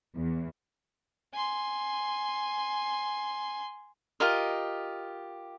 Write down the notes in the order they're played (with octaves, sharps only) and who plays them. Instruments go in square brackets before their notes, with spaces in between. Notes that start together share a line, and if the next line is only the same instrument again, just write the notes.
[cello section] E2
[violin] G#5 C6
[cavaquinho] F4 G4 A#4 D#5